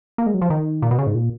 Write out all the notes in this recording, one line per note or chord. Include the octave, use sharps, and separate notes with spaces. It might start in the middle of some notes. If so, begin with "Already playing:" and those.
A#3
G#3
F#3
F3
D#3
A#2
B2
C#3
G#2
A#2